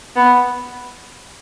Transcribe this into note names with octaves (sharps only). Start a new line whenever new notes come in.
B3